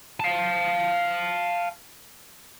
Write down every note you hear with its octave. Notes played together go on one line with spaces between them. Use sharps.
F5 A5